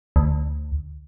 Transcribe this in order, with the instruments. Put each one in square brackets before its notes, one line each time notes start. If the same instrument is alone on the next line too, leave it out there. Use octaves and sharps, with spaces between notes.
[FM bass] D2